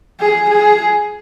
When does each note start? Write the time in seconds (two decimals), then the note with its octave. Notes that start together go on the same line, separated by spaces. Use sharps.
0.20 G#4
0.50 G#4